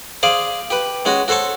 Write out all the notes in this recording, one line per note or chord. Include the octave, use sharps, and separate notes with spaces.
G#4 C5 D5 F5
G4 B4
G#3 C#4 F#4
F#4 A4 C5 C#5 A5